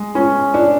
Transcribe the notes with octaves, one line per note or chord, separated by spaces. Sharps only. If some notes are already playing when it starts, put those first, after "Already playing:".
Already playing: G#3
C#4
D4